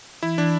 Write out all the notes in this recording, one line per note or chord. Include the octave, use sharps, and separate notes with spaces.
E3 E4
E3 D4